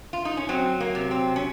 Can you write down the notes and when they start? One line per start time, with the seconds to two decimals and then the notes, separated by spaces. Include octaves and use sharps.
0.13 F4
0.25 D#4
0.37 C#4
0.49 F#3 C4
0.80 A#3
0.95 C3
1.11 C4
1.36 C#4